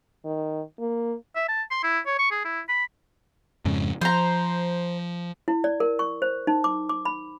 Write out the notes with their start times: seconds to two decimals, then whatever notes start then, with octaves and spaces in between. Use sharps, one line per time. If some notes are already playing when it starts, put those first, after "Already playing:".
0.25 D#3
0.79 A#3
1.35 E5
1.48 A5
1.71 C6
1.83 E4
2.06 C#5
2.19 C#6
2.31 G#4
2.45 E4
2.68 B5
3.65 F2 G#2 C#3
4.01 F3 C5 A#5
5.48 E4
5.64 D5
5.80 A#4
5.99 C#6
6.22 C5
6.47 D#4
6.64 D6
6.89 D6
7.05 B5